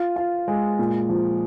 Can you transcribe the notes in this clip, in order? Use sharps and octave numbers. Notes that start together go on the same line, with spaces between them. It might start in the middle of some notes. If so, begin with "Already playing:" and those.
Already playing: F4
F4
G#3
A#2
F3